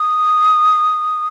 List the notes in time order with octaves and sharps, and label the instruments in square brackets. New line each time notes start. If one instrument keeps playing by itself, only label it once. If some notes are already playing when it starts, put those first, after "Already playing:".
Already playing: [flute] D#6